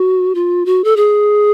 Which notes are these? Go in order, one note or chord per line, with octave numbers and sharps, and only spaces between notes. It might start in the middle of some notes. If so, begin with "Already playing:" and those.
Already playing: F#4
F4
F#4
A4
G#4